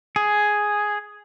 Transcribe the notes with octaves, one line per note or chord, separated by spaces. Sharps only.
G#4